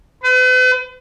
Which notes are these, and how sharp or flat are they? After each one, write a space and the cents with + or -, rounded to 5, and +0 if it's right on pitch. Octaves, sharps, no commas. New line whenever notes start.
B4 +45